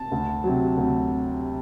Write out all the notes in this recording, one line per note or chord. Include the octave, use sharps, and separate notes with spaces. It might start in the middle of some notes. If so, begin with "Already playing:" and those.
Already playing: A5
D2
C3 F#3
D2